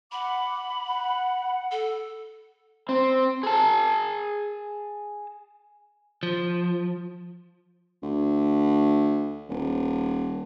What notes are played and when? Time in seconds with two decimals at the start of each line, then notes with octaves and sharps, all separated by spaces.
0.12 F#5 B5 D6
0.86 F#5
1.71 A4
2.89 C4
3.43 G#4 A5
6.23 F3
8.03 D2
9.49 D#1